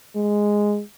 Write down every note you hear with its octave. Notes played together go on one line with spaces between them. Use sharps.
G#3